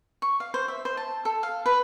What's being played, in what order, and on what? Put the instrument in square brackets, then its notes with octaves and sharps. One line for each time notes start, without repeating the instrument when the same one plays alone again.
[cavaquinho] C#6
F5
C5
E5
C5
A5
A4
F5
B4